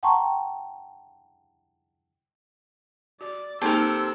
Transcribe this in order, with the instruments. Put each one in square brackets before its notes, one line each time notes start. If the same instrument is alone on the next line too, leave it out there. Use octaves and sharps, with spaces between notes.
[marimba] F#5 G5 A5 A#5 C6 C#6
[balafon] F#4 [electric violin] D5
[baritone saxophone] C3 [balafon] A#3 D#4 [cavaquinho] A4 A#4 [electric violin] E6